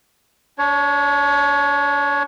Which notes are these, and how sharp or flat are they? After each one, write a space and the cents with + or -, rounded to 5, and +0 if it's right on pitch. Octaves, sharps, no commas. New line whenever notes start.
D4 -30 C#5 +10